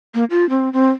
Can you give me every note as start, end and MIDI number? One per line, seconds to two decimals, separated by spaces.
0.14 0.24 58
0.30 0.48 65
0.49 0.72 60
0.73 0.90 60